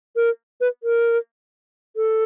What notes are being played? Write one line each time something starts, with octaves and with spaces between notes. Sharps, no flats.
A#4
B4
A#4
A4